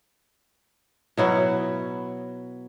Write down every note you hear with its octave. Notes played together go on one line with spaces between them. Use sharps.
B2 F#3 E4